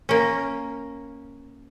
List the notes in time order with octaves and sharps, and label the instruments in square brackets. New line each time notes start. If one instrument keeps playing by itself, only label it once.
[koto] A#3 C#4